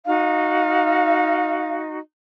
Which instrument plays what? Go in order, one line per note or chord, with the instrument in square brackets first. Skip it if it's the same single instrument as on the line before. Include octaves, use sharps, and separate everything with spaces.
[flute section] D#4 F#4 D#5 [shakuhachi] F5